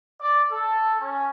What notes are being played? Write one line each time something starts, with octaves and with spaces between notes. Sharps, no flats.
D5
A4
C#4